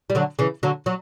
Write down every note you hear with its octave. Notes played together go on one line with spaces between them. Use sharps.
G3
D3 F#3
C#3 E3
D3 F#3
F#3